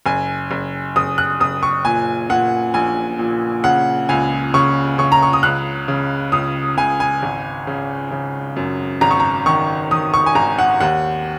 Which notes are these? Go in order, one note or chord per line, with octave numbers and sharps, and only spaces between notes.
F#1 G#5
F#1
F#1 D#6
F#6
F#1 D#6
C#6
A#2 G#5
A#2 F#5
A#1 G#5
A#2
C#3 F#5
C#2 G#5
C#3 C#6
C#3 C#6
A#5
C#6
D#6
C#2 F#6
C#3
C#2 D#6
C#2 G#5
G#5
G#1
C#3
C#3
F#2
G#1 A#5
C#6
A#5
D#3 C#6
D#3 D#6
C#6
G#5
G#1 A#5
F#5
D#2 F#5